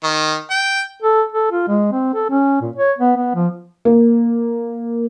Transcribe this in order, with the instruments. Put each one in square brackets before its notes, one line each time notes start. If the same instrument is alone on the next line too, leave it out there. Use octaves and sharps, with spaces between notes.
[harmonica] D#3
G5
[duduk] A4
A4
F4
G#3
C4
A4
C#4
A#2
C#5
B3
B3
F3
[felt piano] A#3